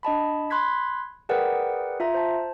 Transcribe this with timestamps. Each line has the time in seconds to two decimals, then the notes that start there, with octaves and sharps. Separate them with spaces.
0.03 D4 D#5 A5 B5
0.50 B5 C6 F#6 G#6 B6
1.29 G#4 A#4 B4 D5 F#5 G5
2.00 F4 E5 A#5
2.14 C5 A5